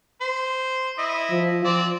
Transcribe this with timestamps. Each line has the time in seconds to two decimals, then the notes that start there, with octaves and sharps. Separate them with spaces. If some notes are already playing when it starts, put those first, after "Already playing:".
0.21 C5
0.98 E4 D#5
1.31 F3
1.65 F3 C4 D5